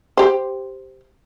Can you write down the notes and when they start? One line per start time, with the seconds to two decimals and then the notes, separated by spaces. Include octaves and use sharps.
0.17 G4 C5